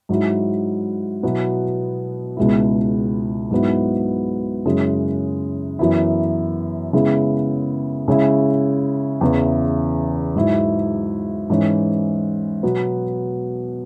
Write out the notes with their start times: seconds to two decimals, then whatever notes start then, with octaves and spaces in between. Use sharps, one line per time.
0.09 G#2 F#3 E4
1.23 B2 F#3 B3 E4
2.37 C#2 B2 G#3 E4
3.51 G#2 F#3 B3 E4
4.65 F#2 C#3 G#3 C#4 E4
5.79 F#2 E3 B3 E4
6.93 C#3 G#3 B3 E4
8.08 C#3 G#3 C#4 E4
9.21 E2 C#3 E3
10.35 G#2 F#3 E4
11.50 G#2 E3 C#4 E4
12.63 B2 F#3 B3